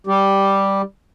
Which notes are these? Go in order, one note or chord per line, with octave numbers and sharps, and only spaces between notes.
G3 G4